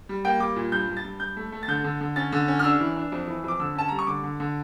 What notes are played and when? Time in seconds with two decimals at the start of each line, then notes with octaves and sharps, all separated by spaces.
0.09 G3
0.25 A#3 G5
0.40 G3 D6
0.56 A#2
0.72 G2 G6
0.88 G2
0.97 A6
1.04 G2
1.20 G2 G6
1.37 A3
1.52 A3
1.63 A6
1.68 D3 G6
1.84 D3
2.01 D3
2.16 C#4 A6
2.32 D3
2.48 C#4
2.59 F6
2.64 D4 E6
2.80 E3
2.96 D4
3.12 F2
3.27 E3
3.44 F2 D6
3.60 D3 E6
3.75 C#4 A5
3.89 G3 A#5
3.99 C#6
4.07 D3 D6
4.23 D3
4.40 D3